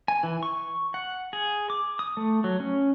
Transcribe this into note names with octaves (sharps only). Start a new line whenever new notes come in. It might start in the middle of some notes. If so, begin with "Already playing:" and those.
G#5
E3
C#6
F#5
G#4
D6
D#6
A3
F#3
C#4